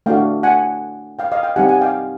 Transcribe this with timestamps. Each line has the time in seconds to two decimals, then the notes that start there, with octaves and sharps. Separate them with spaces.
0.06 A3 D4 F#4 F5 G5
0.43 F#5 G#5
1.19 F5 G5
1.32 D#5 F5
1.43 F5 G5
1.56 G3 C4 D#4 G4 F#5 G#5
1.68 F#5 G#5
1.81 F5 G5